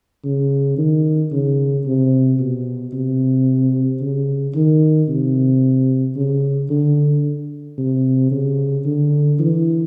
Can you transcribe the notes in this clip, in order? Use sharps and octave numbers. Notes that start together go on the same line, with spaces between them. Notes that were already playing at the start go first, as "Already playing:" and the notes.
C#3
D#3
C#3
C3
B2
C3
C#3
D#3
C3
C#3
D3
C3
C#3
D3
E3